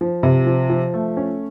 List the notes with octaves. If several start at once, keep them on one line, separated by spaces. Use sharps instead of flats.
F3
C3
F3
F3
A3
C#4